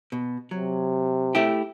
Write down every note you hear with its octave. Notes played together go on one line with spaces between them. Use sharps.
B2
C3 F#3
A3 E4 G4